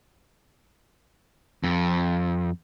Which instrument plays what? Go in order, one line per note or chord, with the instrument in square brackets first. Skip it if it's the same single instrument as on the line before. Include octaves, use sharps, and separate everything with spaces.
[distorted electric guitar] F2